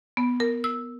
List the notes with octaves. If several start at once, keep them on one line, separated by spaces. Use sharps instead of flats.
B3
A#4
E6